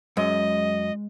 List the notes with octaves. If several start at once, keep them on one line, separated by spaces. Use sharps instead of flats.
F#2 G#3 D#5